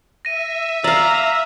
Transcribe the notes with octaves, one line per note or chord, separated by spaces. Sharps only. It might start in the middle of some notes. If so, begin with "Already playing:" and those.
E5 A#6 D#7
D5 F5 A#5 E6